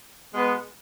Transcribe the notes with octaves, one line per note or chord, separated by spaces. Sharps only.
B2 G#3 B3